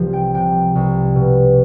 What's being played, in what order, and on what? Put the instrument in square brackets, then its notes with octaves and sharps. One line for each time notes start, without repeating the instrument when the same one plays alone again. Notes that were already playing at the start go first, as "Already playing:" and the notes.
Already playing: [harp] C2 F3
G5
C3 G5
C2
B2